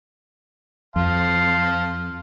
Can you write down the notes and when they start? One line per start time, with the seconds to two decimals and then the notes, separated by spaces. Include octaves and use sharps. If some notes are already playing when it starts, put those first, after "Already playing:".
0.96 F2 F5 A5 C6